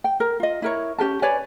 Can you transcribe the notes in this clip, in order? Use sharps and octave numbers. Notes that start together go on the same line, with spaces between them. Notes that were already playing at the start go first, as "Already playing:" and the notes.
G5
A#4
F4 D#5
E4 A#4 C#5
C#4 G4 A#4 A5
B4 C#5 D5 G#5